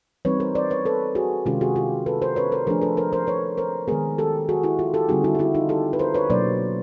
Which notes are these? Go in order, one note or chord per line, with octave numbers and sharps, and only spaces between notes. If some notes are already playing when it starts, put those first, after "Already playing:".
E3 G3 C4 D#4 B4 C#5
A#4 C5
C5 D5
B4 C#5
A4 B4
F#4 G#4
C3 D#3 G#3 C#4 F4 G4
F#4 G#4
F4 G4
A4 B4
A#4 C5
B4 C#5
A#4 C5
F3 A3 D4 G#4 A#4
A4 B4
A#4 C5
A#4 C5
B4 C#5
A#4 C5
D#3 G#3 B3 G#4 A#4
G4 A4
F#4 G#4
E4 F#4
F4 G4
G4 A4
D3 G3 C4 D#4 F#4 G#4
E4 F#4
G4
E4 F#4
D#4 F4
G4 A4
B4
A#4 C5
B4 C#5
B2 F#3 A#3 D4 C5 D5